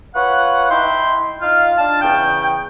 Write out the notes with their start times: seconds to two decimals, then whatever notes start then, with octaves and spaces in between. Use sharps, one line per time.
0.15 F4 B4 C#5 F#5
0.71 D#4 E4 G5 C6
1.42 D#4 F4 F5
1.78 D4 F4 F5 A5
2.01 E2 C#3 G5